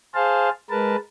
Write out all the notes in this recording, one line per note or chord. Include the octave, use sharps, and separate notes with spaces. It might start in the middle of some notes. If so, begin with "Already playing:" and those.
G#4 C5 F5 A5
G#3 A#4 B4 A5